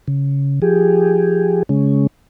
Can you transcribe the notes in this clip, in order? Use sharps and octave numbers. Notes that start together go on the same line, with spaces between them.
C#3
F3 G4 G#4
C#3 G#3 C#4